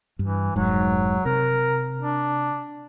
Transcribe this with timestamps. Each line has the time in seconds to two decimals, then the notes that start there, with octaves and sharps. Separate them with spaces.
0.19 G2 E3
0.56 F1 G#2 F#3
1.25 C3 A#4
1.99 D4